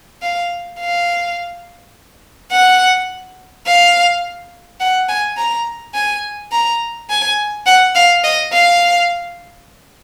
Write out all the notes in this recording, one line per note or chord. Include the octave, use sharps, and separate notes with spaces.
F5
F5
F#5
F5
F#5
G#5
A#5
G#5
A#5
G#5
F#5
F5
D#5
F5